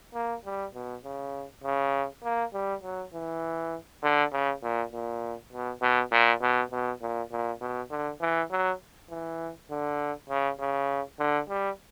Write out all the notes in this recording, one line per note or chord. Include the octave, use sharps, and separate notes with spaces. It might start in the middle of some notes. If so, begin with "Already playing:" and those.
A#3
G3
B2
C#3
C#3
A#3
G3
F#3
E3
D3
C#3
A#2
A#2
B2
B2
A#2
B2
B2
A#2
A#2
B2
D3
E3
F#3
E3
D3
C#3
C#3
D3
G3